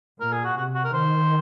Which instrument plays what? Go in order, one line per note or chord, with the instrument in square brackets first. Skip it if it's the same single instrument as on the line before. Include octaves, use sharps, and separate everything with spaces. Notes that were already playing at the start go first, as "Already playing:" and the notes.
[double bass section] A#2 [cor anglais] A#4
[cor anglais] G#4
F#4
[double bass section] C3 [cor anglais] F#4
[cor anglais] F#4
A#4
[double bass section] D#3 [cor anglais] C5